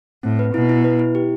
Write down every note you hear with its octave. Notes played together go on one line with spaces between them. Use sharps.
A2 C4
B4
B2 E4
E4
B4
E4
G4